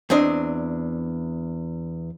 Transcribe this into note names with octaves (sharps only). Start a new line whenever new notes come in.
E2 C4 D4 D#5